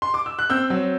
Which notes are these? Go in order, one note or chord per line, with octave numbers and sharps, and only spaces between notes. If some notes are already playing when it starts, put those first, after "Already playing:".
C6
D6
E6
F#6
C4 E6 G6
F#3